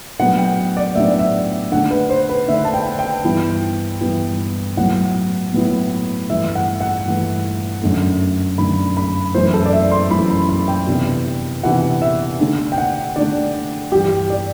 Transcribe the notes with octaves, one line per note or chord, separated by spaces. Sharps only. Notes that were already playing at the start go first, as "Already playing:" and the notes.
A2 F#3 B3 D4 F#5
G5
D5
A2 F#3 B3 D4 E5
D5
E5
D3 A3 D4 F#5
B4
C5
B4
D3 A3 D4 E5
A5
G5
G5
G2 E3 B3 E4
G2 E3 B3 E4
A2 F#3 B3 E4 F#5
A2 F#3 B3 E4
G2 E3 A3 E5
F#5
F#5
G2 E3 A3
F#2 D3 A3
F#2 D3 A3 B5
B5
F#2 E3 A3 E4 C5
A4
D5
E5
C6
F#2 E3 A3 E4 B5
B5
B5
G5
C3 E3 B3 D4
C3 E3 B3 D4 F#5
E5
D3 A3 D4
G5
F#5
D3 A3 D4 D5
G2 E3 G3 G4
D5